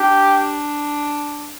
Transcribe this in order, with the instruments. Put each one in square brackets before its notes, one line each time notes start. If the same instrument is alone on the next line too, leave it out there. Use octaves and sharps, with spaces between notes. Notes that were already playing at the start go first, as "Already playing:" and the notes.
Already playing: [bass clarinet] D4 [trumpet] G4